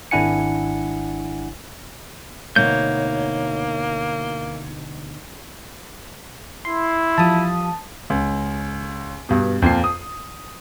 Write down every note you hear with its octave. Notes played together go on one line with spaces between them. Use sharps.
G#1 D4 E4 F#5 G#5 C#7
D2 B2 A#3 D#4 C#5 G6
E4 C6
F3 G3 A5 D#6
C#2
G2 B2
F2 A#2 F4 A5 C7
D#6